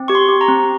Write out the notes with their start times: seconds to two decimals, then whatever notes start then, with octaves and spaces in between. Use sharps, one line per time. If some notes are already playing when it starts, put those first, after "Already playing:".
Already playing: C4
0.08 G4 C#6
0.15 C6
0.29 G4
0.41 A#5
0.48 C4